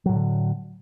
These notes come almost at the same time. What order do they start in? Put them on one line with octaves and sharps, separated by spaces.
F#3 A2 D#3 D3